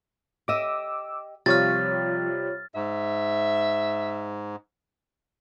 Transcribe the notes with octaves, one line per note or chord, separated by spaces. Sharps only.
G4 D#5 E5 D6 E6
C3 F3 G3 F4 C#5 F6 A6
G#2 E5